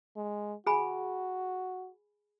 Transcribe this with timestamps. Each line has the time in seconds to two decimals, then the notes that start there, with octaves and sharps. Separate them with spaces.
0.16 G#3
0.67 F#4 G#4 G#5 B5